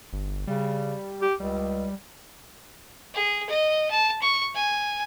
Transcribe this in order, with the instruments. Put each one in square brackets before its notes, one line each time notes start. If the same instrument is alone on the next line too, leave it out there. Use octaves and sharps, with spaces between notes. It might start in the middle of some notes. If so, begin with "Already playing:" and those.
[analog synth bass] G1
[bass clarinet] C#3 [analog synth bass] G3
[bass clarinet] G4
[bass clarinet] C#2 [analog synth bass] G3
[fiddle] G#4
D#5
A5
C#6
G#5